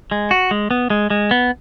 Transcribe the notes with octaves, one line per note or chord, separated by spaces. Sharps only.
G#3
F#4
G#3
B3
G#3
G#3
B3